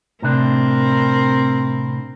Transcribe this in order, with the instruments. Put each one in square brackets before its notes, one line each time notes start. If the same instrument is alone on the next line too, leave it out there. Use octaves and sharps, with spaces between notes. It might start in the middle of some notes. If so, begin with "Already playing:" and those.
[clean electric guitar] A2 C3 D4 [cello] C4 A#4